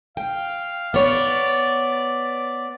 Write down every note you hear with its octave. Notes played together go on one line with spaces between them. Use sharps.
F5 G5
B3 C#5 D5